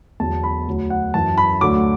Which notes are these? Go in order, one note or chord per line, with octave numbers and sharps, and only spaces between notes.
E2 D3 F#3 A5
B5
D2 D3 F#3
F#5
F#2 E3 A5
B5
D2 D3 F#3 D6